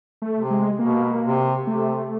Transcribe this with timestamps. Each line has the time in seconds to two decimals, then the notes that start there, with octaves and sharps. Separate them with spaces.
0.22 A3
0.36 C3
0.50 G#3
0.79 B2 A#3
1.24 C3
1.67 C3 A3